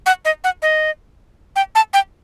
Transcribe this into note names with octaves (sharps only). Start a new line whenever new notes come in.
F#5
D#5
F#5
D#5
G5
A5
G5